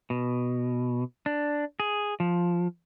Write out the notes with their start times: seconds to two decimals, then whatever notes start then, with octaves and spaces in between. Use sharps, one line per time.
0.10 B2
1.26 D4
1.80 G#4
2.20 F3